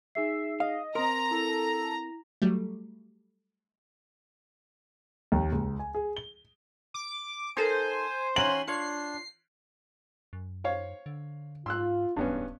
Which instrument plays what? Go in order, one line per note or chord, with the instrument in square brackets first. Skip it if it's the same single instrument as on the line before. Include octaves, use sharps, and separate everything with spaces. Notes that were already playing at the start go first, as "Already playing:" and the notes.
[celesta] D#4 G#4 C7 [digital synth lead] E5
[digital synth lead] D#5 [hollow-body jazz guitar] F5
[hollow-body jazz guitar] C4 A#4 [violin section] A#5 [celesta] C6
[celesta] E4 [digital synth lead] A4
[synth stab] F#3 G3 A3
[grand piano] D#2
C#2
G#5
G#4
G7
[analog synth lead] D6
[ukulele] D#4 A4 A#4 [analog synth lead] C5 [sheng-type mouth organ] G#5
[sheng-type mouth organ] C#4 G#5 C6 [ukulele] F#4 F5 A#5 [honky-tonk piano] F#7
[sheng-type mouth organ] D4 [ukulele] F4 C#5 F5 [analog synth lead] C7
[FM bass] F#2
[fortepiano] C5 C#5 F5
[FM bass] D3
[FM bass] G#2 [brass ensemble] F4 [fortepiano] C6 E6 F#6
[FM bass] D1 [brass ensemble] E2 C#3 [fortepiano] G2 B3 C#4